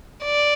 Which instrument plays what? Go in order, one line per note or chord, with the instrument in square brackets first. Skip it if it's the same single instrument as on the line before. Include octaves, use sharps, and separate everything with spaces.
[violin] D5